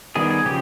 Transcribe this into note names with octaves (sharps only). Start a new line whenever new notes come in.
D#3 G3 B3 G#4
G#4
C#3 F3 G4